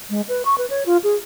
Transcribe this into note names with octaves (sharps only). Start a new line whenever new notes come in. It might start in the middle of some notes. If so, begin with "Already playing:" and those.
G#3
B4
C#6
B4
C#5
F4
G#4